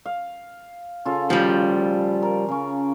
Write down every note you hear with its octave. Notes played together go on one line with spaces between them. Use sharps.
F5
C#3 F4 A4
F3 G3
A#4
C#3 C#4